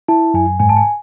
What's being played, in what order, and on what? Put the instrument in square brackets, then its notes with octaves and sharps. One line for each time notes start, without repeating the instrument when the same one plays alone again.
[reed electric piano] E4 [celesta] A5
[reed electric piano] F#2 [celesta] G#5
[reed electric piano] G#2 [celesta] G#5
[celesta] A5
G#5